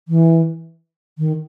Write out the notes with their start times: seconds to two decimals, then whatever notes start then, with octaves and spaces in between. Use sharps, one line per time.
0.08 E3
1.18 D#3